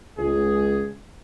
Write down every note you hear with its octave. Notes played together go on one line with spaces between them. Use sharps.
C#2 G#4